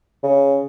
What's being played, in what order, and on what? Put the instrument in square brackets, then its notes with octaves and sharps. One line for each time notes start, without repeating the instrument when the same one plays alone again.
[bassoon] C#3